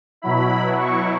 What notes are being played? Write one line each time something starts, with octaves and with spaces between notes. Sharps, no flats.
B2 F#3 E4 B5
C#6